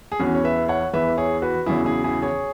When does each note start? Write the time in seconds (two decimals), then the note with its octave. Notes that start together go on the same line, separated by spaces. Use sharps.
0.12 G#4
0.20 E2 E3 C#4 F#4
0.35 C#5
0.44 B4 E5
0.68 C#5 F#5
0.94 E2 E3 B4 E5
1.17 G#4 C#5
1.42 F#4 B4
1.66 E2 C#3 F#3 E4 G#4
1.85 E4 G#4
2.04 E4 G#4
2.22 G#4 C#5